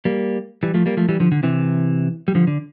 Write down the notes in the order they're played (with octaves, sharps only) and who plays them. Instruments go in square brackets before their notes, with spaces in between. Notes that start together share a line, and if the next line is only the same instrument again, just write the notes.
[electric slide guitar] G3 A#3
E3 G3
F3 A3
G3 A#3
F3 A3
E3 G3
D3 F3
D3
C3 E3
G3
D3 F3
D3